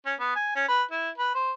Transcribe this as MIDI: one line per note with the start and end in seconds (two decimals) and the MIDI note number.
0.06 0.14 61
0.20 0.34 59
0.36 0.51 80
0.56 0.65 61
0.68 0.83 71
0.91 1.10 64
1.18 1.31 71
1.35 1.51 72